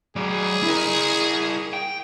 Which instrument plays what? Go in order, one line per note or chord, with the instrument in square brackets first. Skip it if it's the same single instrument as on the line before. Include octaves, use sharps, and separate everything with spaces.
[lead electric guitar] F#3 D5 [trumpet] G#4
[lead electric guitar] E4 A#4
G5